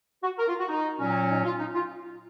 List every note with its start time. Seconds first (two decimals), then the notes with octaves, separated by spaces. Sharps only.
0.23 F#4
0.39 A#4
0.48 F4
0.59 F#4
0.68 D#4
0.99 A#2 F#3 C#4
1.29 D#4
1.44 F4
1.60 D#4
1.74 F4